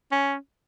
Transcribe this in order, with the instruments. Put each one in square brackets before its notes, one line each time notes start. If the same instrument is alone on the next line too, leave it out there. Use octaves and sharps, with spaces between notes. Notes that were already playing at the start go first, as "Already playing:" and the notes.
[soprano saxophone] C#4